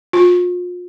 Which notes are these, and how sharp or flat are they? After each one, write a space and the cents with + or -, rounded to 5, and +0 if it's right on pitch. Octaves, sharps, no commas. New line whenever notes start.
F4 +35